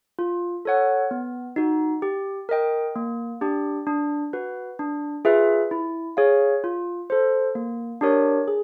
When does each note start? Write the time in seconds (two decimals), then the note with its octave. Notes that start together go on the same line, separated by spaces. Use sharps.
0.19 F4
0.65 A4 C#5 F#5
1.11 B3
1.56 D#4 F#4
2.02 G4
2.49 A#4 D#5 G5
2.96 A#3
3.41 D4 G4
3.87 D4
4.33 F#4 B4
4.79 D4
5.25 F4 G#4 B4 E5
5.71 E4
6.17 G#4 C#5 F5
6.64 F4
7.10 A4 C5
7.55 A#3
8.01 D4 G4 A#4 C#5
8.48 G#4